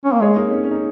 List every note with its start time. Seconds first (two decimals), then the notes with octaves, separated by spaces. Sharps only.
0.05 C#4
0.13 A#3
0.21 G#3 G#4 C#5
0.36 A#3 D#4
0.50 C#4
0.63 C#4
0.71 D#4